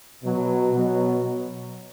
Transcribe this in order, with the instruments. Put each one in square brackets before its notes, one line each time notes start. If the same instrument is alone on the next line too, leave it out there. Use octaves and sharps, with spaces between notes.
[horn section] B2 F#3
B2 F#3